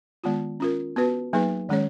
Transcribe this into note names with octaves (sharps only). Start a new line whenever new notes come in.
D#3 G#3 B3 F4
C#4 F4 A#4
B3 F#4 B4
F#3 A#3 D#4 G#4 B4
D#3 G#3 C#4 G#4 C#5